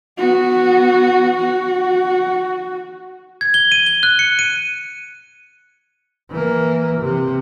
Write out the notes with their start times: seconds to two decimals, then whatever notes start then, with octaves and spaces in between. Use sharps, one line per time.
0.17 B3 F#4
1.38 F#4
3.41 G#6
3.54 G7
3.72 D#7
3.86 G7
4.03 F#6
4.19 C#7
4.39 D#7
6.30 E3 A#3
7.01 C3